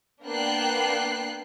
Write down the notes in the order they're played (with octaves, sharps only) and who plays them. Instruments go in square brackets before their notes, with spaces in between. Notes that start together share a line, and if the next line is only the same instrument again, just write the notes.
[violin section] A#3 B3 D4 G5 F#6 C7